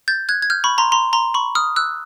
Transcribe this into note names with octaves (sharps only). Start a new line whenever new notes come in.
G6 A6
F#6 G#6
G#6
F6 G6
B5 C#6
A#5 C6
A#5 C6
A#5 C6
B5 C#6
D#6 F6
E6 F#6